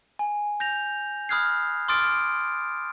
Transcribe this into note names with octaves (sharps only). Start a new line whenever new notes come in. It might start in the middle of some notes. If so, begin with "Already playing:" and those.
G#5
G6 A#6 F7
B5 D#6 F6 F#6 G#6 C7
C6 D6 D#6 F6 A6 D7